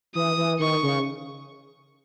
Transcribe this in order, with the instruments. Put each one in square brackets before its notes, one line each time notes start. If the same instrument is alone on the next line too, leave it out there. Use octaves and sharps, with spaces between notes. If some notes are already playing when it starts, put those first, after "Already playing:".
[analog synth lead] E3 [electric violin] D#6
[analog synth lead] E3
[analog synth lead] D#3 [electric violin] C#6
[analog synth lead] C#3